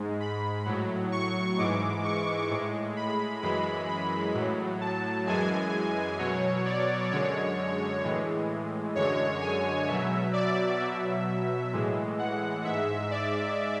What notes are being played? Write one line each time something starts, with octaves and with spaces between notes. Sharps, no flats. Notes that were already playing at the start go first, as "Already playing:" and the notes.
Already playing: G#2 G#3
B5
A2 F#3
C#6
G#2 E3 G#3 D6
C#6
A2 G#3
B5
F#2 E3 G#3 B5
B5
A2 F#3
A5
F#2 E3 G#3 G#5
B2 F#3 C#5
D5
F#2 D3 G#3 C#5
A2 E3 G#3
F#2 D3 G#3 C#5
G#5
B2 F#3 E5
D5
B2 F#3 E5
A2 E3 G#3
F#5
G#2 G#3 E5
D5